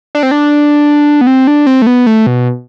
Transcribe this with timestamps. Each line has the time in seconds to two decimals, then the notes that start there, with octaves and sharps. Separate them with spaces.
0.15 D4
0.23 C4
0.31 D4
1.21 B3
1.27 C4
1.47 D4
1.67 C4
1.82 A3
1.87 B3
2.07 A3
2.27 B2